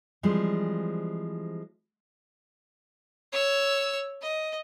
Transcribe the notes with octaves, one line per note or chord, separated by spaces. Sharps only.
E3 F3 G3 G#3 C4
C#5 E6
D#5